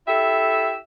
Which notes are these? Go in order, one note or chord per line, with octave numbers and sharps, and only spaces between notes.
E4 G4 A4 E5